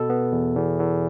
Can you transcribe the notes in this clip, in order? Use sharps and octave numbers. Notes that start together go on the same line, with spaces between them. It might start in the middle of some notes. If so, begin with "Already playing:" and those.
Already playing: B2 A4
B3
E2
E2
E2